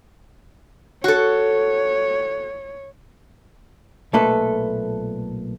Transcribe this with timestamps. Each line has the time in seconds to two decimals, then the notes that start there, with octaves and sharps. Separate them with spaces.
1.04 F#4 A4 C#5
4.13 B1 A#2 A3 A4 B4